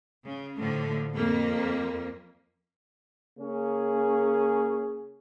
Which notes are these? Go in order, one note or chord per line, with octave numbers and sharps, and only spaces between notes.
C#3
A2 D3 F3
F2 A#3
C#3 A#3 C#4 G#4